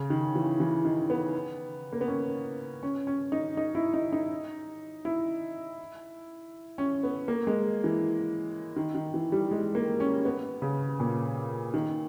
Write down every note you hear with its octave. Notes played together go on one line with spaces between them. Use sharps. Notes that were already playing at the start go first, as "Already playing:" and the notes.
Already playing: C#3
D#3
E3
E3
D#3
B3
A#3
B3
C#4
C#4
C#4
D#4
D#4
E4
D#4
D#4
E4
C#4
B3
A#3
G#3
E3
D#3
D#3
E3
G3
G#3
A#3
C#4
B3
C#3
A#2
D#3